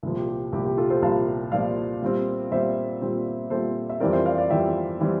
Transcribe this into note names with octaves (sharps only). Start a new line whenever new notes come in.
C2 A#2 F3
G4
G4
C2 A#2 F3 G4
G4
F4 A4
A4 C5
C2 A#2 F3 F5 A5
C2 A#2 F3 D5 F5
A#2 G3 C4
A#2 G3 C4 C5 E5
A#2 G3 C4
A#2 G3 C4 A4 C5
E5
F2 E3 G3 C4 A#4 D5
C5 E5
D5 F5
D5 F5
F2 E3 G3 C4 E5 G5
E3 G3 C4